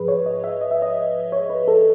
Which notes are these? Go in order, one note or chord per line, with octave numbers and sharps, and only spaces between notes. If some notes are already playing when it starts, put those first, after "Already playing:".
Already playing: G#2 F3 G#4 B4
C#5
D#5
E5
D#5
E5
D#5
C#5
B4
A4